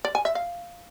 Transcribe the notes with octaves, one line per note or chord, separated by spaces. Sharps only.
D5
G#5
E5
F5